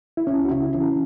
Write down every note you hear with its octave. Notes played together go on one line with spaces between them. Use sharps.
E4
C#2 C#4
F#4
C#3 E4
E3 C#4